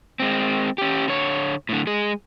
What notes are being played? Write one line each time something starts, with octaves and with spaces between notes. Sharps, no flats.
G#3 C4
C#4 G4
D3 C#5
A2 D3
G#3 G#4